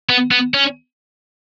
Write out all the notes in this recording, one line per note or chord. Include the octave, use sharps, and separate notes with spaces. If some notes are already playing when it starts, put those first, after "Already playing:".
B3
B3
C#4